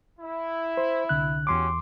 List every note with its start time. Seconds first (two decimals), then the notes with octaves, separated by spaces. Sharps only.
0.19 E4
0.77 C5
1.09 C2 D3 F#6
1.47 E2 C#4 F#4 G4 C6 D6